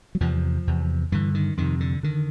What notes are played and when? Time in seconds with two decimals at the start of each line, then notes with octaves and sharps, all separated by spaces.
0.15 F#3
0.20 E2 C3 F3
0.67 E2 C3
1.12 G2 D3 E3
1.35 D#3
1.57 F2 C3 D#3
1.80 D3
2.03 D3 D#3